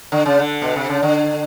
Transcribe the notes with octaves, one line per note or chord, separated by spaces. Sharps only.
D3
C#3
D3
B2
C3
C#3
D3